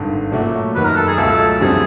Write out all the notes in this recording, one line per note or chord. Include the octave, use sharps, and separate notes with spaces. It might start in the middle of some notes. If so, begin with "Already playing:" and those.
Already playing: G#1 G2 D3
A#2 F#3 A3 C#4 F#4
F#2 D#3 F#3 B4
A#4
A4
G#4
C#2 B2 F#3 A3 A4
F#2 D3 G3 C4 G#4